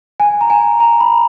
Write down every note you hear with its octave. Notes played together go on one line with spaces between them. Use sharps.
G#5
A#5
G#5
A#5
B5